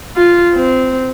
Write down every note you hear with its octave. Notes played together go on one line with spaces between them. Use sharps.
F4
C4